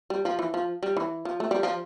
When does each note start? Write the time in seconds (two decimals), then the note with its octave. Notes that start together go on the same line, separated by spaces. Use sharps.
0.10 G3
0.25 F3
0.39 E3
0.54 F3
0.83 G3
0.97 E3
1.25 F3
1.40 A3
1.51 G3
1.63 F3